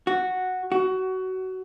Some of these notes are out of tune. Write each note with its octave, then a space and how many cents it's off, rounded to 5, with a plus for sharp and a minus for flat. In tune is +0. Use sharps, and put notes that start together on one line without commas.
F#4 -5
F#4 +20